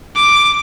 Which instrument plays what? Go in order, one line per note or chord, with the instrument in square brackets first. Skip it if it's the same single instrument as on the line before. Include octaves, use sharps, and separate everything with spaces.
[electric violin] D6